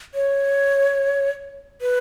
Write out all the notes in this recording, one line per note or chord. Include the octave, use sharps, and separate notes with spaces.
C#5
B4